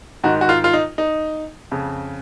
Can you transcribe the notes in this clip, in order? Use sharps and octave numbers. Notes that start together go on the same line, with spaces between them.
G#2 D#3 F#4
F#4
F4
F4
D#4
D#4
F2 C#3